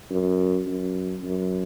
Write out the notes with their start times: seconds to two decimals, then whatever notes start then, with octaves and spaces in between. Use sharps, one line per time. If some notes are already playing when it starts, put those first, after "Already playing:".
0.10 F#2
0.67 F#2
1.23 F#2